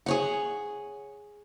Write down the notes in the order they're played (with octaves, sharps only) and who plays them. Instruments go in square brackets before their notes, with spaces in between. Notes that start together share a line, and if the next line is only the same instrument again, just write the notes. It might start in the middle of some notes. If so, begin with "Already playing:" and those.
[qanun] G#4 C#5 F#5